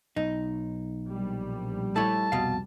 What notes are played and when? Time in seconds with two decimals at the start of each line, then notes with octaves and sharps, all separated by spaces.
0.16 B1 D#4
1.08 A#1 G3
1.96 A3 E4 C#5 A5
2.32 C2 F2 B2 F5